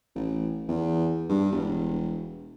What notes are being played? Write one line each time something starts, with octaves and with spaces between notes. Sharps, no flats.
A1
E2
G2
E1